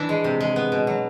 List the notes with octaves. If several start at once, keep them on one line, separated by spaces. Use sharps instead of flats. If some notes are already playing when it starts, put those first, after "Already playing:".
Already playing: E3 D4 E4
G#3
C3
G#3
B3
B2
F#3